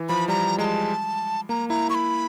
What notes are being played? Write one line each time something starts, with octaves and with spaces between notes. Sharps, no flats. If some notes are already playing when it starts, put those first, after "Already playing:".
Already playing: E3
F3 B5
G3 A#5
G#3 A#5
A5
A#3 A#5
E4 A#5
E4 C#6
B5